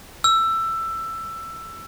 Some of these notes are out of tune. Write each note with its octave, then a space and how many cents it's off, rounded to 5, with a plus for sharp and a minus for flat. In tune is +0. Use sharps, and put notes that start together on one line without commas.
E6 +15